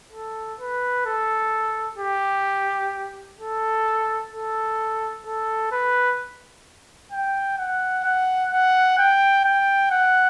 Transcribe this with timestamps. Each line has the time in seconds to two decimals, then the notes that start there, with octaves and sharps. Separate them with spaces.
0.13 A4
0.60 B4
1.06 A4
1.98 G4
3.39 A4
4.32 A4
5.25 A4
5.72 B4
7.12 G5
7.58 F#5
8.05 F#5
8.52 F#5
8.98 G5
9.45 G5
9.92 F#5